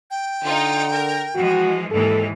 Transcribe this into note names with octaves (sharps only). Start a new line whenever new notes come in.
G5
D3 D#4 F4
A#4
E3 F3 G#3 F#4
D#2 G#2 E3 A4